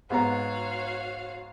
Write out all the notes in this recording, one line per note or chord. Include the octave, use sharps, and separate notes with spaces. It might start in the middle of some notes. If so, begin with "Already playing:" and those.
G#2 B3 F#4 C#5 F5 A#5